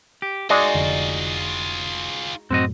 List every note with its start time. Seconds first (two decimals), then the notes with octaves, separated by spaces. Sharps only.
0.22 G4
0.50 G#3 D#4 F4 F#4 G#4 D5
0.75 F1 D3
2.51 F#2 A2 C4 F#4 D#5